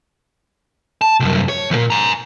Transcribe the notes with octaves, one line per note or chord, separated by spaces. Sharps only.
A5
C2 F#2
C#5
E2 A#2
G#5 A#5